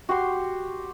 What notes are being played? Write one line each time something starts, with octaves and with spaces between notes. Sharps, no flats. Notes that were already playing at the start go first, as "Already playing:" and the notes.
F#4 G4 C6